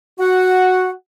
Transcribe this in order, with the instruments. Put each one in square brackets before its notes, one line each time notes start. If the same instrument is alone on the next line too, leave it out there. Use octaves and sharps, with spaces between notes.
[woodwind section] F#4 F#5